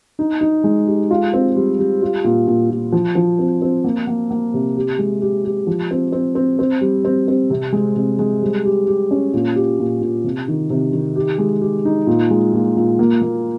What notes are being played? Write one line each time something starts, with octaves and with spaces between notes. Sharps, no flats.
D#4
D#4
G#3
G4
F4
C4
G3
G3
F4
A#2
A#2
A#2
F3
F3
C4
C4
A#3
A#3
A#3
C3
G4
G#3
G4
G4
F3
C4
C4
C4
C4
G3
C4
C4
C3
G#3
C3
G#3
G3
G4
G4
C#4
A#2
G4
A#2
A#2
C3
D#3
C3
D#3
G4
G#3
G4
D#4
A#2
G#3
A#2
A#2
A#3
A#3